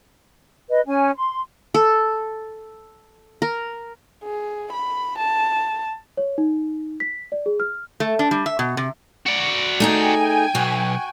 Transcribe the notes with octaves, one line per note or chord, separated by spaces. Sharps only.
B4 D#5
C#4 G#5
C6
A4
A#4
G#4
B5
A5
C#5
D#4
B6
D5
G#4
F6
A3
D4
G3
E5
B2
C3
F#4 D5
A3 D#4 G#4 G5 G#5
B1 F#4